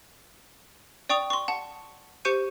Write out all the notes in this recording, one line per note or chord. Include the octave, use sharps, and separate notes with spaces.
D5 G5 C#6 D#6 F7
C6 C#6
F#5 A5
G4 C5 C#6 G6 C#7 D#7